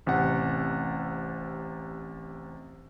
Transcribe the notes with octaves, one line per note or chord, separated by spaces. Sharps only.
A1 C3 F#5